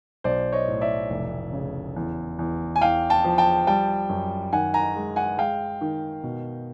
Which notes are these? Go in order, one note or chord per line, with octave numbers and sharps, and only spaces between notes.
B1 C5 D5
C#5 D#5
A2
D5 E5
F1
C#3
E2
E2
G#5
E2 F5 G5
G5 A5
F3
G5 A5
G3 G5 A5
F#2
D#3 F#5 G#5
G#5 A#5
G#3
F#5 G#5
G#3 F5 G5
D#3
B2